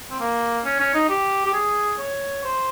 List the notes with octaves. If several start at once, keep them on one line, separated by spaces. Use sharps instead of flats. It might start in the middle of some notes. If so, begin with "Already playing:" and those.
C4
A#3
C#4
C#4
D#4
G4
G4
G#4
C#5
C5